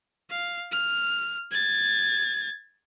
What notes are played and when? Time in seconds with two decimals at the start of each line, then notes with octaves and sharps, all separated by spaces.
0.30 F5
0.71 F6
1.51 G#6 A6